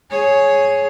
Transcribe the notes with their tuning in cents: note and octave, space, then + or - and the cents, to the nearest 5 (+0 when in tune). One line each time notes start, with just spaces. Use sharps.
G#4 +10 C#5 +0